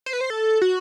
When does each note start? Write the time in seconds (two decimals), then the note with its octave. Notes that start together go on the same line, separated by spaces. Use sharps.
0.06 C5
0.13 B4
0.21 C5
0.30 A4
0.62 F#4